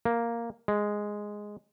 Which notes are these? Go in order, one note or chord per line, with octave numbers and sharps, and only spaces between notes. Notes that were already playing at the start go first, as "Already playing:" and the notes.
A#3
G#3